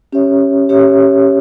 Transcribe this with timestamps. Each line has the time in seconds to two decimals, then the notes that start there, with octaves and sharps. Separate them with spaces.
0.12 C#4 G4 C#5 E5
0.69 C#4 G4 C#5 E5